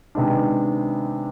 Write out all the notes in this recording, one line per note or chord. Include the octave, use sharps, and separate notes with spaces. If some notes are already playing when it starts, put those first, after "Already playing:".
C3 D#3 G#3 B3 D4